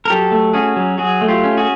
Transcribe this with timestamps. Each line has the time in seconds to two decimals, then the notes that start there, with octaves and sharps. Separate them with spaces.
0.05 A#4
0.10 F#3 G4 A4
0.31 A3
0.54 C#4 F#4 G#4
0.76 F#3
0.98 F#3 F#4 G#4
1.21 A3
1.28 F4 G4
1.44 C#4
1.57 F#4 G#4